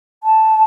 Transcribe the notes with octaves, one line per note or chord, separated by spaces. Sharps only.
A5